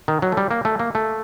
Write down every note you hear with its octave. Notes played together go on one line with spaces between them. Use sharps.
D#3
F#3
A3
G3
A#3
A3
A#3
A3